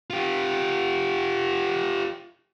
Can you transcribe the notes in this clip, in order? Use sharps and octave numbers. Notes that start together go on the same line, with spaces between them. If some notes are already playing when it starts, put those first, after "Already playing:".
F4 G4